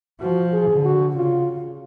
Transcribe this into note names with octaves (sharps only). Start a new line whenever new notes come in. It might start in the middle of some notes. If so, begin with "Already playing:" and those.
F3 F#4
G#4
D3
F#4
C#3 F4